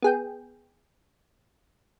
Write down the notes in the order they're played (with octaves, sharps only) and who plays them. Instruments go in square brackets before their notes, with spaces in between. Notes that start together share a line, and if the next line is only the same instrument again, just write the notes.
[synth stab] B3 G#4 G5